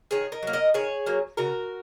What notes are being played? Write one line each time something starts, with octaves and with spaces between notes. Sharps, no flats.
D#3 G#4 C#5
A#4 D#5
F#3 A#3
A#4 D#5
D#3 G#4 C#5
F#3 A#3
C#3 F#4 A#4